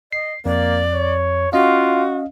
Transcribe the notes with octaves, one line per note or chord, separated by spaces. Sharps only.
D#5 C7
F2 A#3 D5
C#5
C#4 F4 F#4 D#5 F5